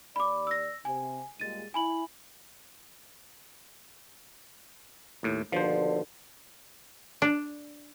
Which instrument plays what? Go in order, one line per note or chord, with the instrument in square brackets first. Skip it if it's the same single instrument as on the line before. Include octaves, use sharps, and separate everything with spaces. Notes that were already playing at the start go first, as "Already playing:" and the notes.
[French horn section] D#2 D5 [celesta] B5 D6
[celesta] E6 A#6
[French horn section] C3 [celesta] G#5
[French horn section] A#2 G3 G#3 [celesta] A6 D#7
[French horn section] E4 [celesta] G#5 B5 F#7
[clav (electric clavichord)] D#2 A2
[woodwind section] D#2 B2 D3 [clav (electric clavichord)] F3 C5
[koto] D4